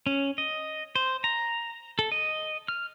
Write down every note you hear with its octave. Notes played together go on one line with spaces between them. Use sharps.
C#4
D#5
C5
A#5
A4
D#5
F6